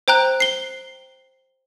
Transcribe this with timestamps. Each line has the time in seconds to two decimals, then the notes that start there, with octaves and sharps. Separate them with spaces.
0.08 C5 G5 A#5 F#6
0.40 C7 G7